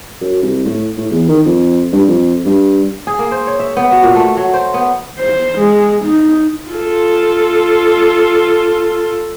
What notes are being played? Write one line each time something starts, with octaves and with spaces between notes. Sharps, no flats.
F#2
C2
A2
A2
E2
D#3
F2
G2
F2
G2
G#4
A#3
C5
C#5
E5
B3
F#4
A#2
A3
F#3
C5
B3
C5
G#3
D#4
F4 A4